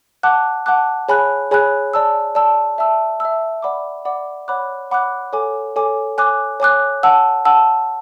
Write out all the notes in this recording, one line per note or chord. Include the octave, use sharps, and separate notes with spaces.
F#5 A5 D6 F#6
F#5 A5 D6 F#6
G#4 C#5 G#5 B5 F#6
G#4 C#5 G#5 B5 F#6
D5 A5 E6
D5 A5 E6
E5 A5 E6
E5 A5 E6
D5 F#5 B5 D6
D5 F#5 B5 D6
C#5 F#5 B5 D6 F#6
C#5 F#5 B5 D6 F#6
A4 C#5 G#5 D6
A4 C#5 G#5 D6
C#5 G#5 D6 F#6
C#5 G#5 D6 F#6
F#5 A5 E6
F#5 A5 E6